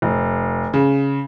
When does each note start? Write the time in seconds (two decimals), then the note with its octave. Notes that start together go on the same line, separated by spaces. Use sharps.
0.02 F1
0.74 C#3